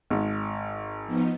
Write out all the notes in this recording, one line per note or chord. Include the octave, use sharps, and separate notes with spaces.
G#1
F3 B3 D#4